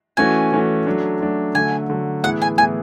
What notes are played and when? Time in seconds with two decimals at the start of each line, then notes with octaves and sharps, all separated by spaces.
0.17 E3 A3 C#4 F#4 G#5
0.52 E3 A3 C#4 F#4
0.86 F#3 A3 D4
1.21 F#3 A3 D4
1.55 D3 F#3 A3 G#5
1.90 D3 F#3 A3
2.23 A2 E3 B3 E4 G#4 F#5
2.42 G#5
2.58 A2 E3 B3 E4 G#4 G#5